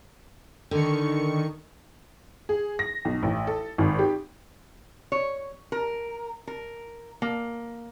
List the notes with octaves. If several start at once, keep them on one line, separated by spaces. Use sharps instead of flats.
D3 D#3 C#6 C#7
G#4
A#6
B1
A1
A4
G#1
G4
C#5
A#4
A#4
A#3